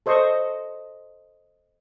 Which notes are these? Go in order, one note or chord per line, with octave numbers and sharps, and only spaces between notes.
A4 C5 D#5 C#6